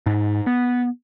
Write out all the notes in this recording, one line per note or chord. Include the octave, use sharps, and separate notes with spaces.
G#2
B3